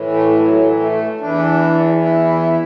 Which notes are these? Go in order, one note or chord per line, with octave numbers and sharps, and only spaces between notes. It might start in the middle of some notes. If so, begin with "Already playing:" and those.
Already playing: A2 E3
A3
A3
F#3
A3
E2 E3 D4
E4